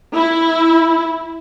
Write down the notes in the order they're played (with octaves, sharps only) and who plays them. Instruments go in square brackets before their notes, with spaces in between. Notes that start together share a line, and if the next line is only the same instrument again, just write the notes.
[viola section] E4